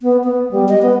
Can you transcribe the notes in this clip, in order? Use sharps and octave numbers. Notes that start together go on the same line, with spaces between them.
B3
B3
G3
D#5
B3